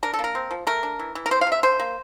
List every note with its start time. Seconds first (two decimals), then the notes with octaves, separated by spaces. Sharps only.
0.03 D4 A#4
0.14 A4
0.19 A#3
0.24 A#4
0.35 C4
0.51 F3
0.67 A3 A#4
0.83 D4
0.99 E3
1.15 E3
1.26 A#4
1.31 C4 C5
1.41 F5
1.47 C3 E5
1.63 D3 C5
1.79 A#3